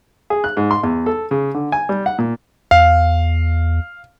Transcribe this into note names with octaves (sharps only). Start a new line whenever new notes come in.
G#4
F#6
G#2
C6
E2
A4
C#3
D3
G#5
G3
F#5
A#2
E2 F5